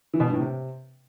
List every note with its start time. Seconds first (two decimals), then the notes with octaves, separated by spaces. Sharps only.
0.14 E3
0.20 B2
0.27 G2
0.33 A2
0.40 C3